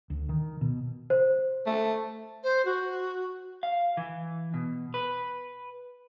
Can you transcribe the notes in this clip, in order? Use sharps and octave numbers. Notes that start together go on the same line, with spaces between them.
D2
D#3
B2
C5
A3
C5
F#4
F5
E3
B2
B4